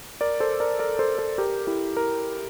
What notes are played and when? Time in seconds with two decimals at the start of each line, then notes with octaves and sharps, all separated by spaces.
0.21 A#4 D5
0.40 A4 C5
0.60 A#4 D5
0.79 A#4 D5
0.99 A4 C5
1.18 A4 C5
1.38 G4 A#4
1.67 E4 G4
1.97 A#4